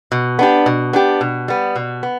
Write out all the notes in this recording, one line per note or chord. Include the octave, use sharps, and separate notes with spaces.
B2
B3 D4 G4
B2
B3 D4 G4
B2
G3 B3
B2
B3